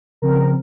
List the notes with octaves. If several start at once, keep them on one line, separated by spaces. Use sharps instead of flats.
C#3 F3 C4 A#4